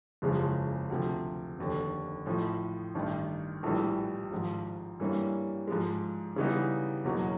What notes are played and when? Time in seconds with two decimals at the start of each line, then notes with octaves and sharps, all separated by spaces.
0.22 F#1 E2 C#3 F3 G#3
0.90 D2 C3 F3
1.58 F1 D#2 D3
2.26 A1 A2 F3
2.95 A1 G2 D#3
3.63 A#1 A2 E3 G3
4.32 G#1 G#2 F3
5.00 G2 E3 G3 A#3 C#4
5.68 G#2 F3 G#3
6.36 C#3 E3 G3 B3 D#4
7.04 E2 B2 F#3 A#3 C#4